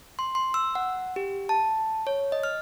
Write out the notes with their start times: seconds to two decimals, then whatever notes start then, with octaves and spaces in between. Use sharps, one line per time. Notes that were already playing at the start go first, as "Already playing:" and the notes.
0.19 C6
0.35 C6
0.54 E6
0.75 F#5
1.16 G4
1.49 A5
2.07 C#5
2.32 D#5
2.43 F6